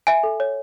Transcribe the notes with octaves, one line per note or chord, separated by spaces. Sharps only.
E5 G#5
A4
C#5